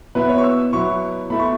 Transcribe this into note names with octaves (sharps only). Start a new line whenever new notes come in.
B2 B3 E4 B4
C#5
C#6
E6
B2 F#3 B3 E4 C#6
B2 A3 E4 B5
C#6